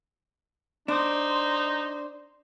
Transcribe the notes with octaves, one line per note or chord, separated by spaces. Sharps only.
D4 D#4 C5